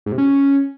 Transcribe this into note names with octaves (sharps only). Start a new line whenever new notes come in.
G#2
C3
C#4